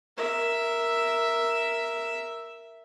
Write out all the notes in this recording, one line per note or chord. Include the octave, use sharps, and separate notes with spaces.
A#4 E5